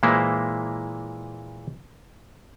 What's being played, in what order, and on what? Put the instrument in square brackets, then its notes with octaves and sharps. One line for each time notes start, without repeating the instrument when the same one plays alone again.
[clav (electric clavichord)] A#2 E3 G#3 A#3 E4 C5